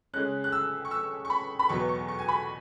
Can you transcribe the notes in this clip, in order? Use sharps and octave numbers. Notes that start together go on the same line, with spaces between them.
C#3 G#3 C#4 F#6
F#6
E6
C#6
E6
C#6
B5
B5
E2 B2 F#3 B3 C#6
C#6
C#6
G#5
B5